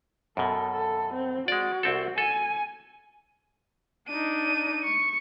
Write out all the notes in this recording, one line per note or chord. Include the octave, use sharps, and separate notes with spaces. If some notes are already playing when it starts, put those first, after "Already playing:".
F#2 B2 A4
A4
C4
G#3 F#4 D5
C2 C4 A4
A4 G#5
D4 D#4 D#7
C#6